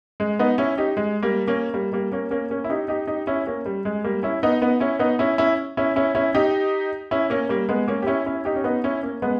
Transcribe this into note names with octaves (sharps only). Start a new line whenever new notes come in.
G#3
B3 D#4
C#4 E4
D#4 G4
G#3
G3 A#3
A#3 C#4
G3 A#3
G3 A#3
A#3 C#4
A#3 C#4
A#3 C#4
E4
D#4 G4
D#4 G4
D#4 G4
C#4 E4
A#3 C#4
G3
G#3
G3 A#3
C#4 E4
B3 D#4
B3 D#4
C#4 E4
B3 D#4
C#4 E4
C#4 E4
C#4 E4
C#4 E4
C#4 E4
D#4 G4
C#4 E4
A#3 C#4
G3 A#3
G#3 B3
A#3 C#4
G4
C#4 E4
C#4 E4
D#4 G4
C#4
B3 D#4
C#4 E4
A#3 C#4
G#3 B3